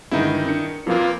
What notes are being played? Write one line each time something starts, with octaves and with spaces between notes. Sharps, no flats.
G2 D3 D#3 G#3 D#4 E4
D4 A#4 C#7
F2 A#2 F3 A#3 F4 B4